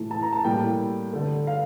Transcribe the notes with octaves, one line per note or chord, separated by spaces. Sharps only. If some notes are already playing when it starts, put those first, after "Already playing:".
Already playing: A2 E3 A3
A5
A#5
A5
A2 G3 A#3 G5
D3 A3
F5